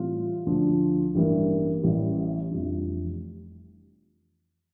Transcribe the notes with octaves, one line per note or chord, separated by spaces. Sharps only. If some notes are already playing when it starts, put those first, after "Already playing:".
Already playing: A2 E3 G3 C4 F4
D2 D3 F3
A1 G2 E3 G3 A#3
A1 A2 E3 G3
F1 F2 E3 G3 D4